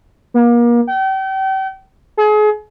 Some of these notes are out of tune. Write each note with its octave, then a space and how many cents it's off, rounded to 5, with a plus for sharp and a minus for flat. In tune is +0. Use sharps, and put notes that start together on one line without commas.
A#3 +35
G5 -35
G#4 +35